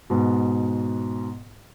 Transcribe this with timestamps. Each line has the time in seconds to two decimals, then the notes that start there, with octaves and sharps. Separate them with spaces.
0.10 G#2 B2